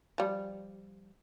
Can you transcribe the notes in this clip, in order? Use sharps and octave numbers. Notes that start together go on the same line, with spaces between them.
F3 G3